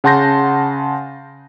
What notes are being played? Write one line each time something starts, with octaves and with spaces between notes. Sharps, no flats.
C#3 F#5 A5 C6 G6 A#6